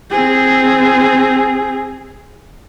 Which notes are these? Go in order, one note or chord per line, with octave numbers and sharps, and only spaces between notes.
C4 G#4